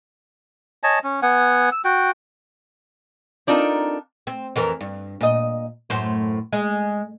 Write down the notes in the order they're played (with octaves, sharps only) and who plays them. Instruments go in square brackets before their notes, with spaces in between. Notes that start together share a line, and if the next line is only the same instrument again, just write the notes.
[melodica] C#5 D#5 G#5 A5
C#4
B3 F#5 G#5
E6
F#4 G5
[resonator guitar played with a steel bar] C4 D4 D#4 F4 A4 A#4
[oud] C4
F2 E3 A#4
G2
A#2 D#5
F#2 A2 C5
G#3